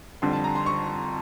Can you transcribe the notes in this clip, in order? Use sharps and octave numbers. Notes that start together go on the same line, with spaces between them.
F2 D3 G3 C6
A5
A#5
C6
C#6